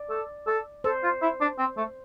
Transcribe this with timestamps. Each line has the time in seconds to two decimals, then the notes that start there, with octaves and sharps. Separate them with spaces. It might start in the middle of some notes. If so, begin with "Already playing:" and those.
Already playing: D5
0.10 A4
0.47 A4
0.84 A4 C5
1.03 F4
1.22 E4
1.41 D4
1.59 C4
1.77 A3